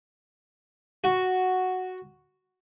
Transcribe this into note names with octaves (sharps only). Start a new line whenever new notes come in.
F#4